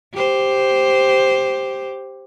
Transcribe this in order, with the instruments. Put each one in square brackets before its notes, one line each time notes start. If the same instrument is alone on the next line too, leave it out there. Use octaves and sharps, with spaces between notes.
[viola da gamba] G4 C5